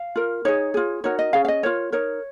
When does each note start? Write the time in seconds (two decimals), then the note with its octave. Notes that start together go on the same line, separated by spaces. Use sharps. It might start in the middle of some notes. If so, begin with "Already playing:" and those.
Already playing: F5
0.16 F4 A#4
0.45 D#4 G#4 C#5
0.74 F4 G#4
1.04 D#4 F#4 A#4 C#5
1.19 D#5
1.33 C#4 G#4 F5
1.45 F5
1.48 D#5
1.63 F4 A#4 C#5
1.92 D#4 A#4 C#5